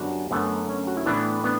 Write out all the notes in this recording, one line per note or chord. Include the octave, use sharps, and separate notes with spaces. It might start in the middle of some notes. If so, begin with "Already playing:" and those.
Already playing: F#2 D3 G3 B3 D4 F#4
F#2 D3 A3 B3
C#4
F#4
E4
A2 E3 A3 B3 D4
B3 D4